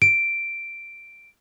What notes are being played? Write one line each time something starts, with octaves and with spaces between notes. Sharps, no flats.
D7